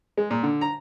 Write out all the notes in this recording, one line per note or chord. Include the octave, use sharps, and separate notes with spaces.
G#3
A#2
D3
A#5